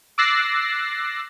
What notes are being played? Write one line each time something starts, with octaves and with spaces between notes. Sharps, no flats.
D6 E6 F#6 A6 A#6 C7